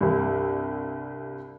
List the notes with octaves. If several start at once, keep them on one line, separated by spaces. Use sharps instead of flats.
C2 G2